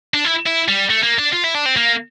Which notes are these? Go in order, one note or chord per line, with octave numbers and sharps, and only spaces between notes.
D4
E4
E4
G3
A3
A#3
D4
F4
E4
D4
C4
A#3